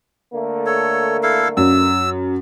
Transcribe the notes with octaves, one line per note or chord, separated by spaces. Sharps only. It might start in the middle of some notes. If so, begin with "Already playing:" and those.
D3 A3 A#3
A4 C#5
E4 A4 F5
F#2 E6